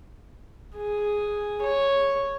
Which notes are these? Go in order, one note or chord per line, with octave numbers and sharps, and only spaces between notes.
G#4
C#5